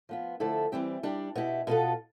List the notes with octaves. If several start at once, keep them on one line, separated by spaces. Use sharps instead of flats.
F3 B3 F4
D3 F3 A3 E4 A4
E3 G3 C4 G4
G3 D4 G4
B2 B3 E4 G4
B2 B3 F4 A4